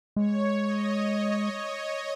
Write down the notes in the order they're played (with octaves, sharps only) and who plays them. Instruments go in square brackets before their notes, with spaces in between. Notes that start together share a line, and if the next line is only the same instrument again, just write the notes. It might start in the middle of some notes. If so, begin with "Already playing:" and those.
[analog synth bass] G#3 [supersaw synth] C#5
[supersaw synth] D#5
C#5